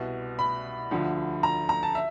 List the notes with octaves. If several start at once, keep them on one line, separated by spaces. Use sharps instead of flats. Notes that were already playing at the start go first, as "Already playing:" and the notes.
Already playing: C2 B2
B5
D2 D3 F3
A#5
A#5
A5
E5